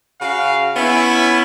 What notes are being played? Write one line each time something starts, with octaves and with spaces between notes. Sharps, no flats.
C#3 F#4 F5
B3 C#4 E4